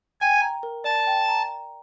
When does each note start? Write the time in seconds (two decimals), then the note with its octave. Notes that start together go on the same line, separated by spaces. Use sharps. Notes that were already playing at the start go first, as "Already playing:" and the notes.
0.21 G5 G#5
0.42 A#5
0.63 A#4
0.84 D5 A5
1.07 G5
1.28 A#5